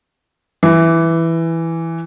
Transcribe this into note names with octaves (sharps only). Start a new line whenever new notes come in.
E3